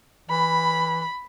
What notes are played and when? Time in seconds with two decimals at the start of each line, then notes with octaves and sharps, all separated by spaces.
0.30 E3 B5